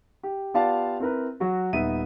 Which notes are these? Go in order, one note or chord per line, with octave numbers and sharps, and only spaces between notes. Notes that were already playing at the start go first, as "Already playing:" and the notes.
G4
B3 F4 G4 D5 F5 A5
C4 E4 A#4 B4
F#3 F#4
D#1 B3 D#4 E5 D#7